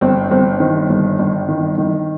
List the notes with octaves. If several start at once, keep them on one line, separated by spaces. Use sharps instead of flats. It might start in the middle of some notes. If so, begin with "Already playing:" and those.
G1 C4
G1 C4
D#3 C4
G1
G1
D#3
D#3